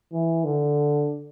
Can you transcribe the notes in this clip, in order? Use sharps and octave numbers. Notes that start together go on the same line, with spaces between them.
E3
D3